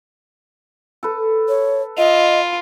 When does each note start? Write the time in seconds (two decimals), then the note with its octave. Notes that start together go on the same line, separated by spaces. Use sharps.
1.03 A4 B4
1.48 C#5
1.98 F4 D#5